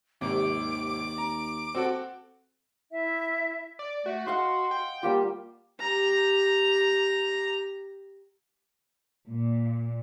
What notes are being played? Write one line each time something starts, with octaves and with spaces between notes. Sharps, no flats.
G#1 D#2 C3 D6
A#5
C4 F#4 A4
E4 E5
D5
A3 F#4
D#5 F5 F#5 C6
G5
G3 A#3 F4 G4
G4 A#5
A#2